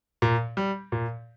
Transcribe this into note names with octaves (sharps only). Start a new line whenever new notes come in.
A#2
G3
A#2